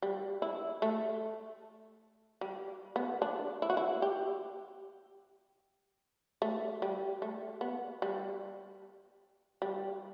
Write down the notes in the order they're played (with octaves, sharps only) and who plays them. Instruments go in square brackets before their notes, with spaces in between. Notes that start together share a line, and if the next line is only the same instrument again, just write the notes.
[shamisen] G3
E4
A3
G3
B3
D4
E4
F#4
E4
G4
A3
G3
A3
B3
G3
G3